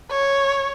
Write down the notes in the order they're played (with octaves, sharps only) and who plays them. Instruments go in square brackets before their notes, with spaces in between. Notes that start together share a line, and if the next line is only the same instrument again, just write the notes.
[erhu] C#5